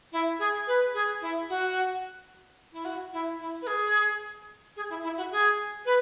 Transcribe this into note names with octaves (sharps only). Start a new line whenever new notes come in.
E4
G#4
B4
G#4
E4
F#4
E4
F#4
E4
E4
B4
G#4
G#4
E4
E4
F#4
G#4
B4